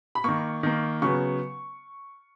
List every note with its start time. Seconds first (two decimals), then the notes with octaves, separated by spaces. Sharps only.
0.15 B5
0.24 D#3 A#3 C#6
0.63 D#3 A#3
1.02 C#3 F#3 B3 C#6